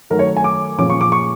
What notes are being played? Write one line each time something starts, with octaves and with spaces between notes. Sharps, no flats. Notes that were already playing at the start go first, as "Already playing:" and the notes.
D#3 F#3 A3 A#4
C#5
G#5
D6
A#2 F3 G#3 C#4 D6
C#6
D6
C#6